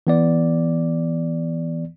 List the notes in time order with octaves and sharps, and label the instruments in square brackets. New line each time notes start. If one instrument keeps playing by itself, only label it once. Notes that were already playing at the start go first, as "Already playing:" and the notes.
[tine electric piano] E3 B3 D5